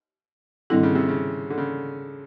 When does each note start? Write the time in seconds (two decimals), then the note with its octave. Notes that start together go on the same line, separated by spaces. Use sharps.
0.70 G#2 D3 D#3 G3 C4 E4
0.83 C#3
0.95 C3
1.09 C#3
1.50 D3
1.58 C#3